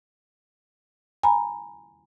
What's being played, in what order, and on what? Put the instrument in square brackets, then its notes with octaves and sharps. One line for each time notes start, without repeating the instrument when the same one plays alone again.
[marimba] G#5 A#5 B5